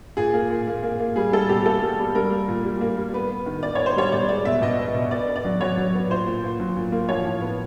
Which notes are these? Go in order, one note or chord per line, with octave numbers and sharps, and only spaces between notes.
A#2 G#4
A#3
A#2
A#3
A#3
A#3
G3 G#4
G3 A4
B2 G4
A#3 A4
G3
G3
G3 A#4
A#3
A#2
G3
A#3
G3
B3 B4
B3
D#3
B3 D5
B3 C#5
C5
G3 C#5
B2 D5
G#3 D5
B2 E5
B2 D#5
B3
B2
B3 D5
B3
D5
F#3
F#3 C#5
F#3
B3
A#2 C5
A#2
A#2
F#3
A#2
A#3
F3 C#5
A2
B3